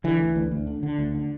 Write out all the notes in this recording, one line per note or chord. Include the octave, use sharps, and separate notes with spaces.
D3 E3
D2
D2
D2
D3
D3
D2
D3